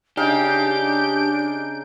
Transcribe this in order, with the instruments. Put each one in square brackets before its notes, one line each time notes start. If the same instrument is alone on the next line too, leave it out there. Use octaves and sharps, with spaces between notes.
[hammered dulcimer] C#3 D#4 F5 [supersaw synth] D4 D7 [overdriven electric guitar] G4 [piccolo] G6